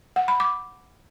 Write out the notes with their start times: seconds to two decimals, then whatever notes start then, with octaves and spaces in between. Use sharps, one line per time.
0.16 F#5
0.28 B5
0.40 D6